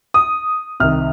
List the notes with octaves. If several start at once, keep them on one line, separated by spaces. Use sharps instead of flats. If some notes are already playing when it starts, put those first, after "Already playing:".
D#6
C2 C3 D#3 F6